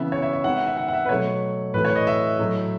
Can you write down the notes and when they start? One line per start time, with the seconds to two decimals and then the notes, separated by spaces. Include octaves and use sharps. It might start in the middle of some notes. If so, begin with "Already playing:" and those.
Already playing: C#3 E3 B3 E5
0.12 C#5
0.22 E5
0.33 E5
0.44 D#3 G#3 B3 F#5
0.55 E5
0.66 E5
0.77 F#5
0.88 F#5
0.93 E5
1.05 B4
1.09 B2 F#3 A3 C#5
1.74 A2 E3 A3 B4
1.85 C#5
1.96 D#5
2.07 E5
2.39 A2 F#3 A3